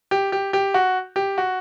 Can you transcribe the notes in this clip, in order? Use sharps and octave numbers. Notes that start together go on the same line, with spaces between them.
G4
G4
G4
F#4
G4
F#4